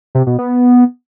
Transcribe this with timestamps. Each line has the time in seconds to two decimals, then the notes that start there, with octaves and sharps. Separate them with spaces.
0.15 C3
0.27 B2
0.39 B3